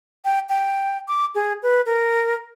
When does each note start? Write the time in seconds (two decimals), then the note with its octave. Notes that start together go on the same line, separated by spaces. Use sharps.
0.25 G5
0.49 G5
1.08 D6
1.35 G#4
1.63 B4
1.86 A#4